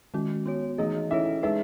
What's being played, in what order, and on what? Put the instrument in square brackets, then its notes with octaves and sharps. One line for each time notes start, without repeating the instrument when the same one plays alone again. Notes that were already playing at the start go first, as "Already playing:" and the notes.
[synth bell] D#3 G#3 C#4 F#4
B3 F#4 C#5
[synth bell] E3 A3 D#4 G#4 [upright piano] D#5
[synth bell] C#4 E4 A4 C#5 [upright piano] E5
[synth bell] G#3 D#4 G#4 B4 [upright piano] E5